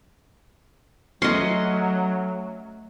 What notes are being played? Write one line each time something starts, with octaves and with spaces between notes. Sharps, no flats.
F#3 A3 C#4 D#5 C6